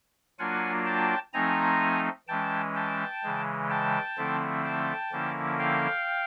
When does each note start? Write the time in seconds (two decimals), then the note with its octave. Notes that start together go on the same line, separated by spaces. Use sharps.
0.39 F#3 A#3 D4 F4 F#5 G#5
0.86 G5 A5
1.33 F3 A3 C4 D#4 G#5 A#5
2.28 E3 G#3 C#4 G5 A5
2.75 G5 A5
3.23 C#3 E3 G#3
3.70 G5 A5
4.17 D3 F3 A3 C4 E4
4.64 G5 A5
5.12 D3 F3 A#3 C#4 E4
5.59 F5 G5